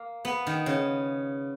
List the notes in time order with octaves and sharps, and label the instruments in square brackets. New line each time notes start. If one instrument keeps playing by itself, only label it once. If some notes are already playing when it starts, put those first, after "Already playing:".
Already playing: [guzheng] A#3
B3
D#3
C#3